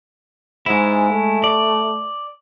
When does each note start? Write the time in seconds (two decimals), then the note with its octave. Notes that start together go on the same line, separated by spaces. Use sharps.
0.66 G#2 G#3 E4
1.11 A3
1.44 D5